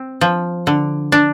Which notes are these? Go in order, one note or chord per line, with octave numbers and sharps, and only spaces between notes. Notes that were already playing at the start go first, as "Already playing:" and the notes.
Already playing: C4
F3
D3
D4